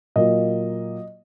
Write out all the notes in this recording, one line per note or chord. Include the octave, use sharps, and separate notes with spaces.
A#2 F#3 A#3 D#5